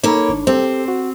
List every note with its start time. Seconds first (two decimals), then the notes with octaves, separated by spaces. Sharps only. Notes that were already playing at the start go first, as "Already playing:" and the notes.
0.04 A#3 D#4 A4 C#5 B5
0.29 G#1 D4
0.47 C4 G4 A4 C5
0.88 F#4